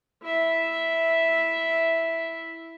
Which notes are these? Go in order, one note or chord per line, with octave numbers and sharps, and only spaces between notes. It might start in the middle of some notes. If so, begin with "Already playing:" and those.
E4 E5